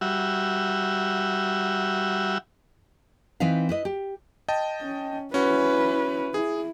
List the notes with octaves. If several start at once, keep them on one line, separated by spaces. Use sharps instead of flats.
G3 F#4 E5
E3 C4 D#4 B4 F5
E4 B4 D#5
G4
D#5 G5 A5
C#4
C#4 E4 F#4 B4
E4 G#4